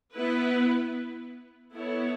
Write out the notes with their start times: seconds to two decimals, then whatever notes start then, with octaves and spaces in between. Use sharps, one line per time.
0.15 B3 E4 B4
1.73 B3 E4 A4 C#5